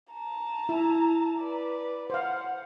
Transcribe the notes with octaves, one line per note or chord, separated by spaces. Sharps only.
A5 A#5
E4
B4 D5
C5 F5 F#5